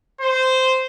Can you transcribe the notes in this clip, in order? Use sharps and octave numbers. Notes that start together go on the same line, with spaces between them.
C5